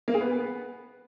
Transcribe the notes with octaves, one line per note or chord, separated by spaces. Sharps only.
A#3
G#4
B3